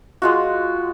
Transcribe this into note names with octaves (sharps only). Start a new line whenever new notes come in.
G#3 F4 F#4